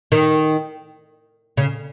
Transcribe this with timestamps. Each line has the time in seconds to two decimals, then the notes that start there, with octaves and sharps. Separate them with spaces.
0.12 D#3
1.57 C#3